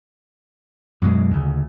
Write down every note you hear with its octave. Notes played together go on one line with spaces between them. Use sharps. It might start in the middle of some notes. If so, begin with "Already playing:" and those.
F#2 B2 G#3
D2 C#3